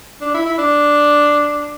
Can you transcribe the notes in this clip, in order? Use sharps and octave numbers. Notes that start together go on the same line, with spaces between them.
D4
E4
E4
D4